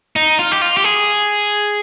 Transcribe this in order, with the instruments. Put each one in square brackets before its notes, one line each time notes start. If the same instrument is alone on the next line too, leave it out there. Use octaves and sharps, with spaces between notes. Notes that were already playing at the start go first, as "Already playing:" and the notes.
[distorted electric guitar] D#4
F4
G4
F4
G4
G#4